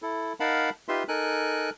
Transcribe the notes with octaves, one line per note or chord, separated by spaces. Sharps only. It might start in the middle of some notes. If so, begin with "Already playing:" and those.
E4 A4
D#4 A#4 F5 F#5 A5 B5
D#4 F4 G4 B4 E5 C6
D#4 A4 A#4 G#5 F#6